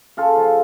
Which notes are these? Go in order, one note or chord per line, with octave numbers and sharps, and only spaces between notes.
C#3 F4 A4
F3